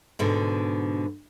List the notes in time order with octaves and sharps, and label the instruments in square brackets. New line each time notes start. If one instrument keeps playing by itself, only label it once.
[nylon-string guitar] G#2 B2 D3